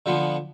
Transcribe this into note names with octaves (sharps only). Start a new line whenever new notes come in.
D3 F3 B3